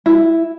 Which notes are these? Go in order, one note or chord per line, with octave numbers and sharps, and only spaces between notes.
E4